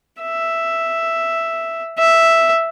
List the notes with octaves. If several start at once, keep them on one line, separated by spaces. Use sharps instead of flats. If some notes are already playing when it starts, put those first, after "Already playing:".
E5
E5